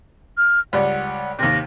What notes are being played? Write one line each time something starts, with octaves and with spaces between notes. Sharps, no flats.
F6
C#2 G3 F#5
D#2 C3 A#6